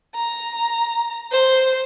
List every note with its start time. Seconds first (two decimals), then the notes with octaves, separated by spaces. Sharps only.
0.16 A#5
1.32 C5